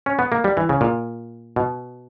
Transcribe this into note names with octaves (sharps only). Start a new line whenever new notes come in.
C#4
B3
A#3
G3
E3
C#3
A#2
B2